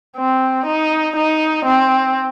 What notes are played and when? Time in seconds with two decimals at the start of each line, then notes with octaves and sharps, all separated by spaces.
0.17 C4
0.66 D#4
1.16 D#4
1.65 C4